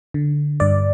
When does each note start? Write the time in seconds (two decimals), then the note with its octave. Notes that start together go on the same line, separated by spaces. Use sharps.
0.14 D3
0.60 G2 D5